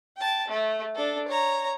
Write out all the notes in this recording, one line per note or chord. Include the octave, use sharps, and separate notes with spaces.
G5 A5
A3
D4 A4
C#5 A#5